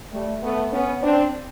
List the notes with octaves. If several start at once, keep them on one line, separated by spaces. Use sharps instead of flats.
G3 A3
A3 B3
B3 C#4
C4 D4